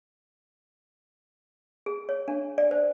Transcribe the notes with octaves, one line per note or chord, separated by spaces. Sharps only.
G#4
C#5
D4
D5
C5